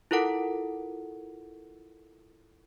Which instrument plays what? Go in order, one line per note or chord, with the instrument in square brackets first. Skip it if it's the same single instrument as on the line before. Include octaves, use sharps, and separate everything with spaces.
[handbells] E4 F4 A4 A#4 F#5 D7